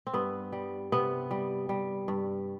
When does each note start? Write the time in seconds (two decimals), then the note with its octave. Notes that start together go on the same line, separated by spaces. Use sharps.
0.07 C4
0.13 G2 B3
0.52 G3
0.92 C3 B3
1.31 G3
1.69 G3
2.08 G2